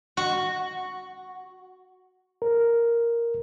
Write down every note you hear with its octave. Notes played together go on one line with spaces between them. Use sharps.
F#4
A#4